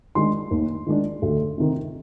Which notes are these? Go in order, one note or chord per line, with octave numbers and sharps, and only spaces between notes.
D#3 G#3 D4 C6
D#2
D#3 G#3 D4
D2
C3 D#3